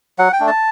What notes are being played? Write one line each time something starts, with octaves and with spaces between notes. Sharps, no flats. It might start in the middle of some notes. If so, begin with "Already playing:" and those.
F#3 F#5
G5
A3 D4
A5